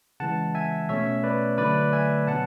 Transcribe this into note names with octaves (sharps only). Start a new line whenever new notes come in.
C#3 E3 G#3 F#5 A5
E5 G#5
B2 A3 C#4 C#5 E5
B4 D5
D3 F#3 A3 D4 B4 D5
E5 G#5
B2 F#3 F#5 A5